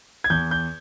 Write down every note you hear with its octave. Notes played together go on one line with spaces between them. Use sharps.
G#6
E2 G6
G6